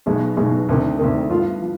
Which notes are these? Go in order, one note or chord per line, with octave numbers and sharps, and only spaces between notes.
B1 B2 G#3 B3
B1 B2 G#3 B3
D2 C3 D#3
D2 C3 D#3
G2 F3 B3 F4
F3